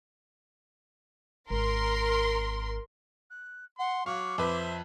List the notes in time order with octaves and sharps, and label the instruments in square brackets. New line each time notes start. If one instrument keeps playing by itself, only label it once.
[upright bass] G#1 [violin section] A#4 C6
[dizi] F#6
[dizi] F#5 [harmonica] C6
[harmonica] F#3 C#6 [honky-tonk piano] F5 [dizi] D6
[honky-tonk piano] F2 B4 [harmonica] C5 E5